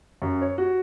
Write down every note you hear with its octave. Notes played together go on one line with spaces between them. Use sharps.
F#2
C#5
F#4